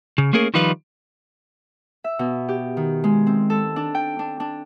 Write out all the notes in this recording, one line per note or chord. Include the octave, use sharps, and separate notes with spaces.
C#3
A3 A#3 C#4 G#4 A#4
D#3 F3 G3 D#4 F4 B4
E5
B2
G4
D#3
G#3
C4
A4
D4
G5
D4
D4